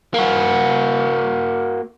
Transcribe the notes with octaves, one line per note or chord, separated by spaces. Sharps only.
A#3 F#4